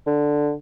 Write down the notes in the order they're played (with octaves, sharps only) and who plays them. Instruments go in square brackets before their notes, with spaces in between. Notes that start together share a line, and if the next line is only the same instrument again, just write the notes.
[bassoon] D3